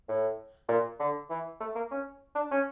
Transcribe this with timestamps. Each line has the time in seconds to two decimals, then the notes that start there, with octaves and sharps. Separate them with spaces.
0.09 A2
0.68 A#2
1.00 D3
1.30 E3
1.60 A3
1.75 A#3
1.91 C#4
2.35 D4
2.51 C#4